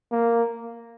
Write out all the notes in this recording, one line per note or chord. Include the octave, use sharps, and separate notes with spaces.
A#3